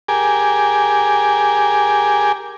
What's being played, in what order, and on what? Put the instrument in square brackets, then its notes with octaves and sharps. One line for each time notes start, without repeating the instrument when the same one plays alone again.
[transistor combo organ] G4 G#4 A#4 G#5 D6